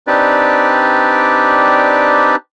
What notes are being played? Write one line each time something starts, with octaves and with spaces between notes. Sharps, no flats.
C4 D4 D#4 G4 B4 D5